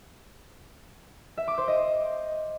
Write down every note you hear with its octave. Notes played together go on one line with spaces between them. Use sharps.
E5
D6
C5
D#5